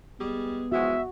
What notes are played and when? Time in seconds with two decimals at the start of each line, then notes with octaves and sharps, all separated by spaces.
0.20 G3 G#3 B3 G#4
0.72 E3 F3 G#3 F#4 E5